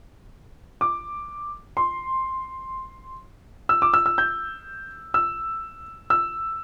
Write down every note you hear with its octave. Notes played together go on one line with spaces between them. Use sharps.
D6
C6
E6
D6
E6
E6
G6
E6
E6